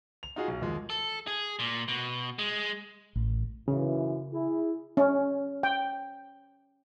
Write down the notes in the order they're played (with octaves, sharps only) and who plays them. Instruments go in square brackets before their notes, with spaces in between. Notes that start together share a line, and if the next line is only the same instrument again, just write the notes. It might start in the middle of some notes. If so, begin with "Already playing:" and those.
[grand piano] F7
D#4 F4 F#4 G#4
B1
D#2 F3 G#3
[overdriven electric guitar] A4
G#4
A#2
B2
G#3
[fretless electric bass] A1
[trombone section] B1 F#2 E3 [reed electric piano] C#3
[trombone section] E4 G#4
[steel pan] C#4
G5